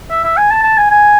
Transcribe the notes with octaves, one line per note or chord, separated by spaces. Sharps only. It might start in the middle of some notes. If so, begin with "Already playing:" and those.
E5
E5
G#5
A5
A5
G#5
G#5